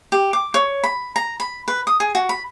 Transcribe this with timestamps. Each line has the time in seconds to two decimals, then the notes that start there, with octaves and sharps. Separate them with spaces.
0.12 G4
0.33 D6
0.54 C#5
0.84 B5
1.16 A#5
1.40 B5
1.68 B4
1.87 D#6
2.00 G#4
2.15 F#4
2.29 B5